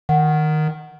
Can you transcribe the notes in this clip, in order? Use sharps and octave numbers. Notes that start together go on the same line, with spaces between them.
D#3 F#5